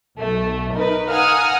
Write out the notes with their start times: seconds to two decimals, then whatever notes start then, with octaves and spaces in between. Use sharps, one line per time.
0.18 B1 A3
0.72 D#4 A#4 B4
1.11 F5 F#5 G#5 A#5 D#6 F6